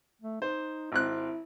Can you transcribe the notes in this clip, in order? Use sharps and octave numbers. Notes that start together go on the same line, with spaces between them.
A3
D#4 C5
G#1 C4 E4 F#6